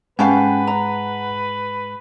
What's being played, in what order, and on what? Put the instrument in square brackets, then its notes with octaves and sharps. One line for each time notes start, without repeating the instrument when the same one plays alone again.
[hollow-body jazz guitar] G#2 [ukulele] C#4 G4 F5 [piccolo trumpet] B4 [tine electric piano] F#5 A5 B5
[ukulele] A#5